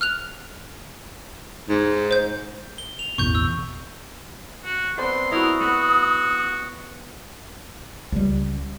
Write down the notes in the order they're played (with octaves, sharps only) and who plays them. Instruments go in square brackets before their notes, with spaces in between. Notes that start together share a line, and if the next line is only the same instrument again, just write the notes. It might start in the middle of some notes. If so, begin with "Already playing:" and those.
[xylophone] F6 F#6 F7
[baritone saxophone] G#2
[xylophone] C5 G6
[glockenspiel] G7
F7
[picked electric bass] A1 E2 B2 [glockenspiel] C#6 G6
[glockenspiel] E6
[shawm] F#4
[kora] B3 C4 D4 [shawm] C6
[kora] E4 F#4 [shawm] A#4 [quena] D#6
[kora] B3 [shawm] F#4
[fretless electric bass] C#2 G3